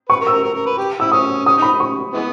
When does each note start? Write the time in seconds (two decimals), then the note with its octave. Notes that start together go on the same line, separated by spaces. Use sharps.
0.09 B4 C#6
0.20 A#4
0.27 E6
0.32 A#4
0.43 A#4
0.55 A#4
0.66 B4
0.78 G4
1.00 E4 E6
1.12 C#4 D#6
1.46 C#4 D#6
1.57 D#4 B5
1.80 C#6
2.14 E3 G#3 B3